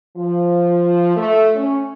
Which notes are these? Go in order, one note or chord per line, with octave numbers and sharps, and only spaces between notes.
F3
A3
C#4